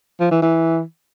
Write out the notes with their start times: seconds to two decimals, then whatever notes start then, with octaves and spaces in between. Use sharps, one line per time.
0.20 F3
0.31 E3
0.42 E3